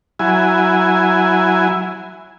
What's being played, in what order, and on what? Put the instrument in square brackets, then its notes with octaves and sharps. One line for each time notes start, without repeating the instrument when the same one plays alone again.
[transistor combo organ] F#3 E4 G#5